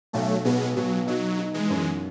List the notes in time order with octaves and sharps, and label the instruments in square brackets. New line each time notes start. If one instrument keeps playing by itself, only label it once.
[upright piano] B1 [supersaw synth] F#3 A3
[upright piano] B2 [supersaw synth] G#3 B3
[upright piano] B2 [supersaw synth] F#3
[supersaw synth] F#3 [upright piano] D#4
[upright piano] D#4
[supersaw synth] E3 G#3
[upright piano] F#2